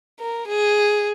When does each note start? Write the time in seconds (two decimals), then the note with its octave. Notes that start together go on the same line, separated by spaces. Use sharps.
0.20 A#4
0.48 G#4